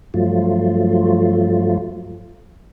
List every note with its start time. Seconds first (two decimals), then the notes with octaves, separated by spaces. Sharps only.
0.14 G2 F3 F#3 A3 F4